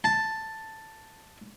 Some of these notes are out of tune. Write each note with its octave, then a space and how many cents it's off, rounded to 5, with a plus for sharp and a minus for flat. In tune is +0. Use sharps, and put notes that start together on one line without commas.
A5 +5